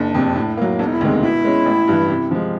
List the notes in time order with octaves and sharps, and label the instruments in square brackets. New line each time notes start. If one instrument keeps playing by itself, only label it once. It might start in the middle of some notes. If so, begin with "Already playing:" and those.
Already playing: [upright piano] F#1 [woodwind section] D4
[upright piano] F2 C3
A2
F#3 A#3
[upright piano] E1 [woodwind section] D4
[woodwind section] D#4
E4
[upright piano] D2 C3 D#3 G#3
[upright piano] B2 [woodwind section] E4
[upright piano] G#3 C#4
A1
G2 E3
C3
F3 G#3